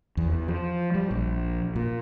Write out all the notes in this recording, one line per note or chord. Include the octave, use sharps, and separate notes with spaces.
E2
E2
F3
G3
A#1
A#2